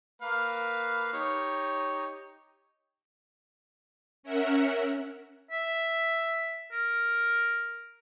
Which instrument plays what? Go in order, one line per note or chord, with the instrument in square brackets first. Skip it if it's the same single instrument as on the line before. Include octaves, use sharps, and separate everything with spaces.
[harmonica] A#3 B4 F5
D#4 G4 C#5
[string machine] C#4 A#4 E5 F#5
[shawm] E5
A#4